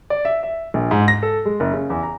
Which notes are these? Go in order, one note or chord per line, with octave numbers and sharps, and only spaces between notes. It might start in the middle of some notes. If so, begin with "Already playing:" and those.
D5
E5
E5
A#1
G#2
A#6
A4
G#3
F#1
C#3
E2
A#5